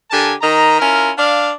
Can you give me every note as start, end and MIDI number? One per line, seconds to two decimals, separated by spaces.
0.11 0.33 50
0.11 0.33 67
0.11 0.33 70
0.11 0.33 80
0.11 0.33 81
0.42 0.76 51
0.42 0.76 75
0.42 0.76 82
0.80 1.11 61
0.80 1.11 64
0.80 1.11 65
0.80 1.11 70
1.18 1.51 62
1.18 1.51 74
1.18 1.51 77